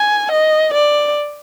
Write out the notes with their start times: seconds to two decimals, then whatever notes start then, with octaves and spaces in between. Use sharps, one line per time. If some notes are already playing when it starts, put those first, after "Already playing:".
Already playing: G#5
0.32 D#5
0.74 D5